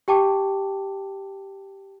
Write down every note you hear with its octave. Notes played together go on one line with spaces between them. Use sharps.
G4 G5 A5 D6